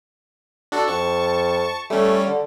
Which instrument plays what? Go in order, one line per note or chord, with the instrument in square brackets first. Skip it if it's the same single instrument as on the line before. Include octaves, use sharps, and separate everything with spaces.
[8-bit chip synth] D4 F#4 A4
[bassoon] F2 [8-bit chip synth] A5 C#6
[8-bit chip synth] G3 C#4 [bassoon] A3
[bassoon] D3